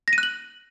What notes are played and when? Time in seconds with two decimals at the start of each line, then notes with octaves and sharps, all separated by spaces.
0.08 A#6
0.13 D#7
0.18 F#6
0.23 F#7